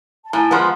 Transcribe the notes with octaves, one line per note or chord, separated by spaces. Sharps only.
A5
A2 G#5 A#5
F3 G#3 B3